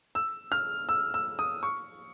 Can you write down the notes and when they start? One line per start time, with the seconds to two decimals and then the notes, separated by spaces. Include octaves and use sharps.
0.15 E6
0.52 F6
0.89 E6
1.14 E6
1.39 D#6
1.63 C#6